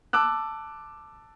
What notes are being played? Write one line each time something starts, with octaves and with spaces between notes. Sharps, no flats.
A5 D6 E6 F#6